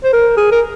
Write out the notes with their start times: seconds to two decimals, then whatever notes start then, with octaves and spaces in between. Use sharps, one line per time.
0.04 C5
0.13 A#4
0.37 G#4
0.52 A#4